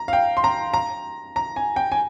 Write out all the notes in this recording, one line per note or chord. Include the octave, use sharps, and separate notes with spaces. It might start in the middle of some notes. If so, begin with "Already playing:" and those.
Already playing: A#5
F5
G5
C6
A#5
A#5
A#5
G#5
G5
G#5